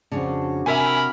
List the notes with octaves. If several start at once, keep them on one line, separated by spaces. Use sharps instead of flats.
F2 G#2 C#3 D4 F#4
C3 A#4 E5 G#5 B5